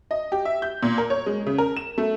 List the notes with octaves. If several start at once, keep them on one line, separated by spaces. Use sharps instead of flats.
D#5
G4
E5
G6
A#2
A#4
C#5
G#3
C#3
A#4
E7
A3